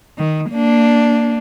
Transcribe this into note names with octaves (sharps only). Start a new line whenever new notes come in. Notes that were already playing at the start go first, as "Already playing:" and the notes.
D#3
A#3 D4